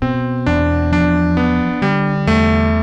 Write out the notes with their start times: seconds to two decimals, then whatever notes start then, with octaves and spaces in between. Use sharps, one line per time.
0.02 B2 C4
0.46 E2 D4
0.92 F3 D4
1.37 B3 D4
1.82 D3 G3
2.27 E2 A3